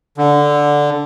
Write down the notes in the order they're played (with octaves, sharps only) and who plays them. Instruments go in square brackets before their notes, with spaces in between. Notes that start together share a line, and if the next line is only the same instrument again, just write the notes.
[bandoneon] D3